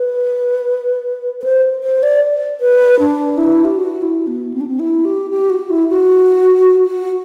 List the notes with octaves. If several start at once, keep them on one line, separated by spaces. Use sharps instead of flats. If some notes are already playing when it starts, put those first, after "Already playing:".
Already playing: B4
B4
C5
C5
D5
B4
D4
E4
G4
F#4
E4
B3
C4
D4
C4
E4
G4
G4
F#4
E4
F#4
F#4